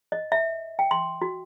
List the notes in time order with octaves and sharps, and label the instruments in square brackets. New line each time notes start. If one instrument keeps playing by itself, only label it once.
[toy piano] D#5
E5
G5
C6
F#4